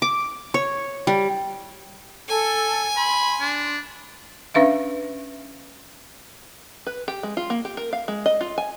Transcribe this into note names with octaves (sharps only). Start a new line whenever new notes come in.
D6
C#5
G3
A4 G#5 E6
B5 C6
D4
C#4 D4 B4 E5 F5
B4
G4
G#3
F4
A#3
G4
A#4
F5
G#3
D#5
F4
G#5